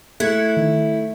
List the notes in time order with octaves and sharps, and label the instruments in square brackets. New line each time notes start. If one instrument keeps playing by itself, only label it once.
[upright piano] A3 [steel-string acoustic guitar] E4 [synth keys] F#6 G#6 C#7
[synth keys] D#3